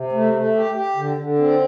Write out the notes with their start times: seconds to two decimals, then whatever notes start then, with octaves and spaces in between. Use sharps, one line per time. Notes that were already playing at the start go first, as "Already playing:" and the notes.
Already playing: C3
0.12 A3
0.33 A3
0.55 G4
0.75 G4
0.96 D3
1.17 D3
1.39 C4